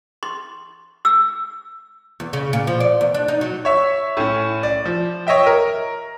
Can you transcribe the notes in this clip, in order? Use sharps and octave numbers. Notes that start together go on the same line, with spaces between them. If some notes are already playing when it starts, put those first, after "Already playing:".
C6
E6
E2
C#3
A#2
F3
D5
E2
D4
D#4
F#3
C#5 E5 C#6
A2 C#4
D5
F3
C#5 D#5 E5 G5
A#4